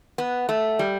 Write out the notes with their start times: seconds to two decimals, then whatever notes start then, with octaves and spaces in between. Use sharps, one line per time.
0.18 B3
0.49 A3
0.79 G3